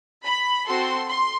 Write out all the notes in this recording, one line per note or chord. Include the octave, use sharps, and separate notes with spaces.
B5
C4 F#4 A4 C6
C6